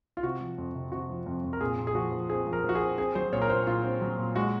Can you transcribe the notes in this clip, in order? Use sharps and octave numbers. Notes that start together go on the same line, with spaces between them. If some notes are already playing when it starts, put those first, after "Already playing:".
F4
C3 F#4
F3
F2
C3
C3 F#4
F3
F2
F2
A#4
A#2 G#4
A#2
G#4
F3 F#4
F3
C4 G#4
F3
A#4
F3 F#4
G#4
C4
C4 G#4
F#3 C5
A#2 C#5
A#4
A#2 C5
A#2 F4
C4
F#3
A#2
G#3 F#4